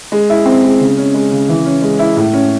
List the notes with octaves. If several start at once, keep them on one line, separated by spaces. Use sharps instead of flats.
G#3
E4
C4
G#3
C#3
C#4
G#3
C#3
E3
C#4
G#3
E4
A2
C#4